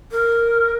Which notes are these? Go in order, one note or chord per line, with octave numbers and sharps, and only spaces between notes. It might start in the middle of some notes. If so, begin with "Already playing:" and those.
A#4